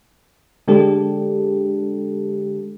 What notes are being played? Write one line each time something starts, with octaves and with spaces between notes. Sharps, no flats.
D3 G#3 D4 G4 A4